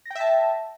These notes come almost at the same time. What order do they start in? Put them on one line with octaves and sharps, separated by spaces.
A#6 G5 E5 A5